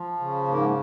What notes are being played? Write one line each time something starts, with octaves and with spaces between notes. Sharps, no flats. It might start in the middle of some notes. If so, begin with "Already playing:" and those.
Already playing: F3
C#3
G#2 A#3